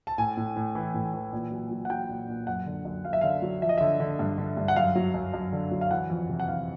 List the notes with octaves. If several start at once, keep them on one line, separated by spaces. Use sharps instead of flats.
A5
A2 G#5
A2
A2
E3
A2
E3
A#2
F#3
F#3
F#5
F#3 G5
A#2
A#2
F#2 F#5
D3
F#2
F#2 F5
E5
D3 F5
F#3
F3 E5
D#5
D3 E5
D3
G2
D3
G2
F#5
F#2 F5
F#3
F#2
F#2
D3
F#3
F5
E3 F#5
F2
C3
F#5
E3 F5